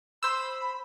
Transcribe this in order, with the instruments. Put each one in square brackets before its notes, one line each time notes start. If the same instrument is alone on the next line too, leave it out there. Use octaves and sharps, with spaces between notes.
[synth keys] C5 E6 [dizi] B5